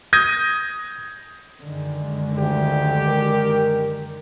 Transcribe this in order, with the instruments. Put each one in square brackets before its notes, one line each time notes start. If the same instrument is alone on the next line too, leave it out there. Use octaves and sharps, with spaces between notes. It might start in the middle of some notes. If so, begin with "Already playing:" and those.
[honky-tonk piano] D#6 G6 G#6 A#6 D#7
[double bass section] F#2 D#3 G#3 [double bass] D3
[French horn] D2 [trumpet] G4
[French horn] A#4